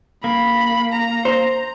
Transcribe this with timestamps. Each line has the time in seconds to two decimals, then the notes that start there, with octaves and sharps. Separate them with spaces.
0.24 A#3 B5
0.93 A#5
1.25 C5